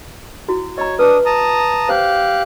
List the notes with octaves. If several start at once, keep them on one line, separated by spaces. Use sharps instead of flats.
E4 F#4
C#5 D#5 A#5
D4 B4 D#6
A5 A#5 D#6
G4 C5 F5 F#6